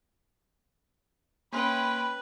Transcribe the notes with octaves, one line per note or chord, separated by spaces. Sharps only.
A#3 C#4 B4 G5 B5 C6